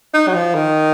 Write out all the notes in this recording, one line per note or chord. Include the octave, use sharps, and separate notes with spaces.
D#4
F#3
F3
D#3